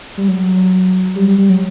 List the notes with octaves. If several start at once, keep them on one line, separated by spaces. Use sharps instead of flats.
G3
F#3
G3
G3
G3
F#3